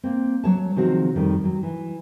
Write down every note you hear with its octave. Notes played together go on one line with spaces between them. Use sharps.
A#3 C4
F#3 C#5 A5
C3 D#3 F3 G#3 C4 F#4
F2 D#3 G3
F#3
E3